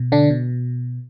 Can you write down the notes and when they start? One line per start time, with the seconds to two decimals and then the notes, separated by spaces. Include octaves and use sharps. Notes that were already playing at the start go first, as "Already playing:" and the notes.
Already playing: B2
0.12 D3 D4
0.30 B2